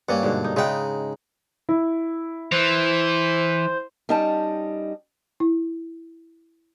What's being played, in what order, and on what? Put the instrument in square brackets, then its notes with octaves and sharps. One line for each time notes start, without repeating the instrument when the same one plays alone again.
[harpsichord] G2 A#3 [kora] C#4 F#5
[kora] G#2 B2 D3
D#4
[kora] C#3 D#4 F#5 [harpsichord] G#3 G5
[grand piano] E4
[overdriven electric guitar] E3 [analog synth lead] C5
[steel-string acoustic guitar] G3 C#4 D#4 D#5 G5 A5
[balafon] E4